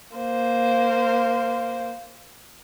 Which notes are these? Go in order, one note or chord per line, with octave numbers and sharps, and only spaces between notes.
A#3 C5